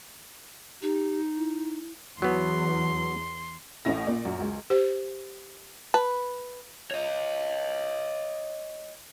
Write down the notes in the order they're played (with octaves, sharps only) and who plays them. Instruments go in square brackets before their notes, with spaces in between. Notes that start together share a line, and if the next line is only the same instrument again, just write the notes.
[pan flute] D#4 [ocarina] G4
[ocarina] E4
[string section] E2 [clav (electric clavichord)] F#3 B3 [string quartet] C6
[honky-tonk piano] A1 A2 A3 C#4 E4 A#6
A#2 D5
F#2
C#2
[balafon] G4 C5
[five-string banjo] B4 [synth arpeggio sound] A5
[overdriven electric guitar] C#5 D#5